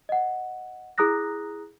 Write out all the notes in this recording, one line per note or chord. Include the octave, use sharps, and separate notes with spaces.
D#5 F#5
E4 G#4 A#5 D#6 F#6 A#6